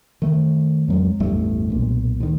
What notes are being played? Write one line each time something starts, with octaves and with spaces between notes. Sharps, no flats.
D#3 A3
F2 F#3 G#3
A1 E2 G2 A3
B1 A#2
D2 D#3